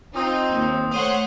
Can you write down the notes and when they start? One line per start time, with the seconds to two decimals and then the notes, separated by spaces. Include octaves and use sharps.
0.16 C4 D#4 F4 D#6
0.51 D#2
0.91 A3 C5 C#5 F#5 D#6 D#7